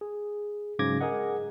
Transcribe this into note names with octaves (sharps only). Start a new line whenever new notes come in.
G#4
G#2 C#3 F#3 D6 G#6 A#6
G#4 A#4 D#5 F#5